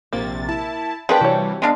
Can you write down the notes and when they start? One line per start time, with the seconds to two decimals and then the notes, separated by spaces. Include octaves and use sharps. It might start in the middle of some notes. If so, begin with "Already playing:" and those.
0.13 A#1 C3 A#3 A6
0.48 E4 A5
1.09 F3 B3 D4 G4 G#4 A#4 B4 G5
1.21 C3 E3 G3 F#4 C#5
1.62 G#3 B3 D4 F5